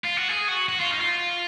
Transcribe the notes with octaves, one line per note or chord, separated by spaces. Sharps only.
F4
F#4
G#4
F#4
F#4
F4
D#4
F4